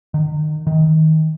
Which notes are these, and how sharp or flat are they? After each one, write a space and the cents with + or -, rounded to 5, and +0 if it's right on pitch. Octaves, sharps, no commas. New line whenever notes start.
D#3 -30
D#3 +20